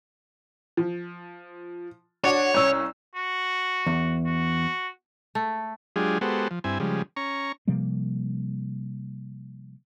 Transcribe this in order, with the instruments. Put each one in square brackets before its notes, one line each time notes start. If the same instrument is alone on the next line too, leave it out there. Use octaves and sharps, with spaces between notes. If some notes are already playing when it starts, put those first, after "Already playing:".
[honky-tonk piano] F3
[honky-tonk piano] D4 F#4 [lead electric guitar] C#5
[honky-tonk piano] C2 C#4 E6
[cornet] F#4
[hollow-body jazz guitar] E2
[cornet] F#4
[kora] A3
[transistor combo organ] F#3 G#3 D4 F4 G4 G#4
G#3 B3 F#4 G4 A4 C5
F3
G2 C4 E4 G#5
C#3 F3 G3 G#3
C#4 A#5 C#6
[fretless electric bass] C3 F3 G3 A#3